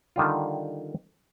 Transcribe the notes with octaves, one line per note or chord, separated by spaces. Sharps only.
D3 D#3 G3 F4